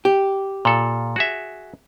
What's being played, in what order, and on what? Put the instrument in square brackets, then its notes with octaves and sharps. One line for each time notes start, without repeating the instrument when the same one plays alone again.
[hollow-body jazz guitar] G4
[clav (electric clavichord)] A#2 A4
F#4 G#4 E5